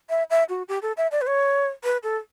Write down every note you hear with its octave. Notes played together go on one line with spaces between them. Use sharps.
E5
E5
F#4
G4
A4
E5
D5
B4
C#5
B4
A4